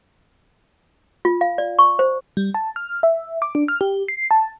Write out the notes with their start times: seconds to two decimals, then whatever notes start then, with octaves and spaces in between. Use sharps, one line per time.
1.25 F4
1.41 F5
1.58 D5
1.79 C#6
1.99 C5
2.37 G3
2.55 A5
2.76 F6
3.03 E5
3.42 D6
3.55 D4
3.68 F6
3.81 G4
4.08 C7
4.31 A5